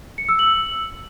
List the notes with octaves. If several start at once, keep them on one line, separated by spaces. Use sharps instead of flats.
C#7
E6
F#7